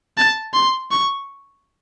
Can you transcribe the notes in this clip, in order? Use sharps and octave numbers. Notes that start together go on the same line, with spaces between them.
A5
C6
C#6